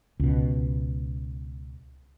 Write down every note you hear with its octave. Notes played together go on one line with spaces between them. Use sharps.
C#2 B2